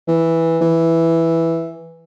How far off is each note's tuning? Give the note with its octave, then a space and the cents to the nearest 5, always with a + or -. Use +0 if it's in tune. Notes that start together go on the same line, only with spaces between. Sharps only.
E3 -5
E3 +0